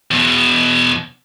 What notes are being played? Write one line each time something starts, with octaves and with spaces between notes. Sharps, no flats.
E2 B2